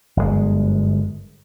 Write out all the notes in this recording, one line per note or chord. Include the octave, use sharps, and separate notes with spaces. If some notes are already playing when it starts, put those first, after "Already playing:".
G1 F#2 A2 G#3